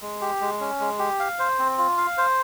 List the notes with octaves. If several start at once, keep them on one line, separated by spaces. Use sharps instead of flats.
G#3
G4
G#3
C#4
G#3
G4
F5
C5
C4
F4
F5
C5